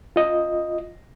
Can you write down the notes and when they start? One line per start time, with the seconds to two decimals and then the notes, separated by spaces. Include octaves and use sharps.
0.16 F4 D#5